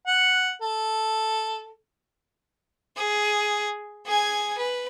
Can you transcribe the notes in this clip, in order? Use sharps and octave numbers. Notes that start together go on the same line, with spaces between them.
F#5
A4
G#4
G#4 G#5
B4